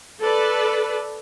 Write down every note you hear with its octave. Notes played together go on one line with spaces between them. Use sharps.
A4 B4 D5